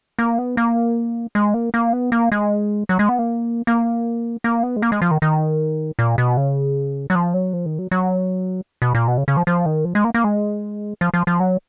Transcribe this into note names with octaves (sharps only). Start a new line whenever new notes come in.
A#3
B3
A#3
G#3
A#3
A#3
B3
A#3
G#3
F#3
G#3
B3
A#3
A#3
A#3
B3
G#3
A#3
G#3
F3
D#3
D#3
A#2
B2
C#3
F#3
F3
F#3
F3
D#3
F#3
F#3
B2
A#2
B2
C#3
C#3
F3
F3
D#3
F3
G#3
A#3
A#3
G#3
F3
F3
F3
F#3